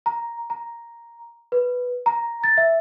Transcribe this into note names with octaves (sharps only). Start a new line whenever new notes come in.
A#5
A#5
B4
A#5
A6
E5